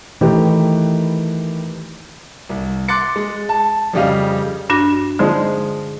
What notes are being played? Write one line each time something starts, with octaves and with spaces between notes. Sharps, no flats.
D#3 E3 A3 G4 B4
C2
C6 D6 F#6 A6 C#7
G#3
A5
F2 C#3 G3 G4 D#5 F5
G2 D4 F#4
D3 F3 G#3 D#4